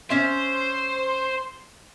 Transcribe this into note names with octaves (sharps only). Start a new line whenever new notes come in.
C#4 C5 E5